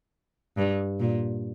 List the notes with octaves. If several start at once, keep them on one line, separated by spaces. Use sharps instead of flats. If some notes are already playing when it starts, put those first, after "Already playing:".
G2
A#2